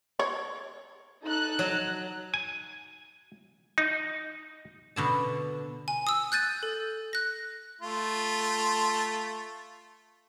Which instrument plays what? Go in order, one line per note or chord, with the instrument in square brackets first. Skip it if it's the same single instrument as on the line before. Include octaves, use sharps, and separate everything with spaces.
[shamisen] C#5
[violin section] D#4 A4 F#6
[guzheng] F#3
[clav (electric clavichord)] G#5
D#4
[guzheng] B2 D3 A5
[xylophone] G#5
D#6 E6
F#6 G6 A6 D#7
A4
F#6 A#6
[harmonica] A3 F4